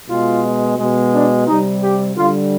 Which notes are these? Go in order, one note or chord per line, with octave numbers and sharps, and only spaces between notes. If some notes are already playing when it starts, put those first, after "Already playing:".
B2 G#3 F4
B2 G#3
D4
C3 G3 D#4
G4
D3 G3 F4